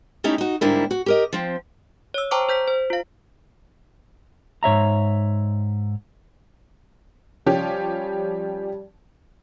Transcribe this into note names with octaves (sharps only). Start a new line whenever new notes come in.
A3 C#4 D#4 E4 G4
D#4 F#4
G#2 D3 G3 A#3 D4 E4
F#4
G4 A#4 D#5
F3 C4
C#5 E6
C5 G5 A5 A#5 C#6 D6
C5 G6 B6
C5
F4 F5
G#2 C#5 E5 A#5
F3 G3 C#4 G4